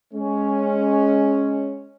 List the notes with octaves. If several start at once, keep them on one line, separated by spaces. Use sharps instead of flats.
G#3 C#4